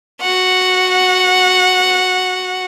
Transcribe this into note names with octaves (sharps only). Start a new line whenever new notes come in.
F#4 F#5